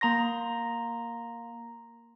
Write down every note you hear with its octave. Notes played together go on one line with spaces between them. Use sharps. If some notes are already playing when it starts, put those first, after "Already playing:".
A#3 A#5 C6 A#6